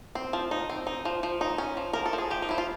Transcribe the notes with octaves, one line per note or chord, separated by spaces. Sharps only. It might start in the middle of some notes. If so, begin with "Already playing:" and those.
C4
F3
D#4
C4
D#4
F3
F3
D#4
C#4
F3
F3 A#4
A4
F3
G#4
F3 G4
D#4
F3 E4
F4